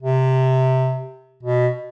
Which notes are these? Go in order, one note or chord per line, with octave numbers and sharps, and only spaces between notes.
C3
B2